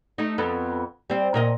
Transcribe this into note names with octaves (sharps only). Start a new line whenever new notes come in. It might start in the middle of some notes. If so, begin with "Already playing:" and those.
A3 D#4
F2 B3 A4
G3 C4
A#2 A#4 D#5